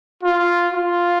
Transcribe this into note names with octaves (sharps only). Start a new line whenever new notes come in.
F4
F4